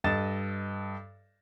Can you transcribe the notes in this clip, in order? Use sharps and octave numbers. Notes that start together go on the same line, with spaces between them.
G2 A4 D#5 A6 E7